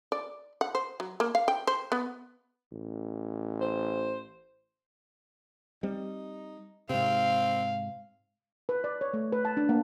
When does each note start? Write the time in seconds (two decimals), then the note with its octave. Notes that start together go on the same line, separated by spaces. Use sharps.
0.12 D5
0.61 F#5
0.75 C5
1.00 F#3
1.20 A#3
1.35 F5
1.48 G5
1.67 C5
1.92 B3
2.72 A1
3.61 C5
5.83 G3 C4 D#4
6.90 G#2 C3 C4 F5
8.69 B4
8.84 D5
9.01 C#5
9.13 A3
9.32 B4
9.45 A5
9.57 D4
9.69 A#3